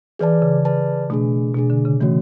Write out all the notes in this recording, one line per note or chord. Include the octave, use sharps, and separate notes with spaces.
E3 G#4 B4 D5 A5
C#3
G#4 B4 D5 A5
B2 A3 D4 G#4
B2 A3 D4 G#4
D3
C#3
E3 A3 C#4 F#4 C#5